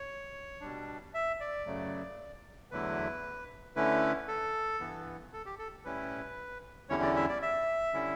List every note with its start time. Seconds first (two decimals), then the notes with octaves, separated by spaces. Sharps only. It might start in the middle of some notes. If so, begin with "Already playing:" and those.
Already playing: C#5
0.61 B2 G3 D4
1.14 E5
1.40 D5
1.66 F#2 C#3 F#3 A3
2.71 E2 D3 F#3 A3 E4 B4
3.76 D3 A3 C#4 E4 B4
4.28 A4
4.80 G2 E3 B3
5.33 A4
5.46 G4
5.59 A4
5.85 A2 G3 C#4 E4 B4
6.89 E2 D3 G3 C#4 E4 C#5
7.03 D5
7.16 E5
7.29 D5
7.42 E5
7.94 D3 G3 C#4 E4